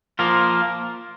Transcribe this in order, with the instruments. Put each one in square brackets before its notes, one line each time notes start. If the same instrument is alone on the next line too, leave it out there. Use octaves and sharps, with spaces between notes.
[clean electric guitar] F3 A#3 F4 A#4